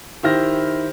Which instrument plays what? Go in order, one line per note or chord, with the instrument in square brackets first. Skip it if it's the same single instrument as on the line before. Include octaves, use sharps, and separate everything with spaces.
[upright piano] D#3 E4 G4 C5 F6 A#6